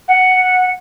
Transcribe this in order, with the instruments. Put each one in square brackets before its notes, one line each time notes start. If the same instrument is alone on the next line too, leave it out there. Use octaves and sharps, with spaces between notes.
[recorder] F#5